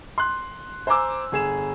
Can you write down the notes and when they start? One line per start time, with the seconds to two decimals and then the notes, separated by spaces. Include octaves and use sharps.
0.18 C6 F#6
0.87 C5 G#5 A#5 D6 E6
1.32 G1 G#4 E7